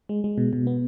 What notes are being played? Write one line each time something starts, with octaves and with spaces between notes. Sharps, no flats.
G#3
G#3
B2
B2
B3